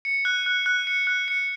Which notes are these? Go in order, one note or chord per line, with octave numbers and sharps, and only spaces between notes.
C#7
F#6
F#6
F#6
C#7
F#6
C#7